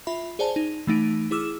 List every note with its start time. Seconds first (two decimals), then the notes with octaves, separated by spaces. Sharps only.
0.07 F4 E5 B5
0.39 G#4 C5 D5 G#5 A5
0.56 D#4
0.87 E3 A3 D#4 D7
1.31 E4 G#4 D6 E6 F6 E7